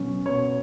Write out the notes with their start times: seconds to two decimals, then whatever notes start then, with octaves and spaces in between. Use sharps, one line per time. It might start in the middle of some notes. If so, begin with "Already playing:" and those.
Already playing: B2 F#3 C#4
0.26 B2 C#5